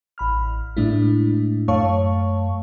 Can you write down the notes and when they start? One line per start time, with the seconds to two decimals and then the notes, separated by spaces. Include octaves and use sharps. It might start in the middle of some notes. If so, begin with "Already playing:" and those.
0.18 A1 B5 F6
0.77 A2 G#3 A3 D4 E4
1.68 F#2 A3 C#5 F5 A5 C#6